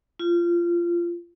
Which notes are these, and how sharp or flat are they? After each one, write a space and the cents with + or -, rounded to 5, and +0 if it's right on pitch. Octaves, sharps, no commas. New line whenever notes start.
F4 -20